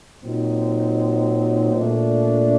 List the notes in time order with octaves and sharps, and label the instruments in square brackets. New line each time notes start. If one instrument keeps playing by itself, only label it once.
[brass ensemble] A#2 F#3 C4 D#4
A#2 A3 D4